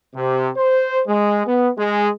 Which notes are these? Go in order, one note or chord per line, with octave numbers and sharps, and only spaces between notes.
C3
C5
G#3
B3
G#3